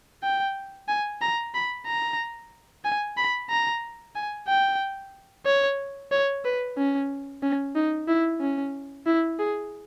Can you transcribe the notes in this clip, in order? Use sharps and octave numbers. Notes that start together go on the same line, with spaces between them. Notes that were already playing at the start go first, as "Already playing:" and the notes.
G5
G#5
A#5
B5
A#5
G#5
B5
A#5
G#5
G5
C#5
C#5
B4
C#4
C#4
D#4
E4
C#4
E4
G#4